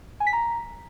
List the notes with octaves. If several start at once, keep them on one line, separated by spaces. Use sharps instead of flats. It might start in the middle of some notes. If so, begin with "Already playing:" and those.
G#5
B6
A#5